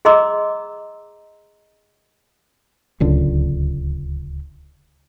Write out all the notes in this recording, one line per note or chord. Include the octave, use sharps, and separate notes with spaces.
G#4 D#5 A#5 C6 D6 E6
D1 C#2 D3